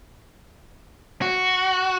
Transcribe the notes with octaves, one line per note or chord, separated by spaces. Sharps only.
F#4